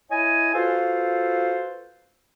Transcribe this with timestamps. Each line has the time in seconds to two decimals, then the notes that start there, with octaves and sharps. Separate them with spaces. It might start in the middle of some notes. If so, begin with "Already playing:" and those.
0.11 E4 C#5 D#5 G#5
0.54 F4 F#4 A4 B4 C5 F5